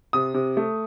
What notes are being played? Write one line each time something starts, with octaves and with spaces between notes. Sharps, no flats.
C3 D#6
C3
A3